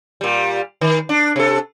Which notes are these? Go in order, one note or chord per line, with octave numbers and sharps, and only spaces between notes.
A#2 G3
D#3
D4
C3 A4